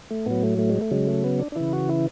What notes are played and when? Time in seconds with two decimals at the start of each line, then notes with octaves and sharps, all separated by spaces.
0.11 A3
0.26 A2 F#3 B3
0.43 A3
0.58 A3
0.70 G#3
0.81 A3
0.91 C#3 F#3 G#3
1.07 A3
1.24 B3
1.39 D4
1.52 D4
1.56 C#3 E3 E4
1.73 F#4
1.89 E4